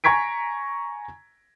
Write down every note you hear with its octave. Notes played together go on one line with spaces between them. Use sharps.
G#5 A#5 C#6 G#6 B6 D7